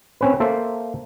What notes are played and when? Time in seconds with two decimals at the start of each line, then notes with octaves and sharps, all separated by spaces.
0.21 C4 C#4 B4
0.40 A#3 A4 C5 E5